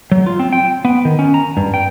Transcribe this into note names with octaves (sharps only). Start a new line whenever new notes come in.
F#3
F4
C4
G5
B3
D#3
C#4
A#5
G2
G5